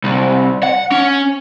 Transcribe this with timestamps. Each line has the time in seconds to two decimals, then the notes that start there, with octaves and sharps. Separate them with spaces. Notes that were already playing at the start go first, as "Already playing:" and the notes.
0.04 C2
0.63 F#5
0.92 C#4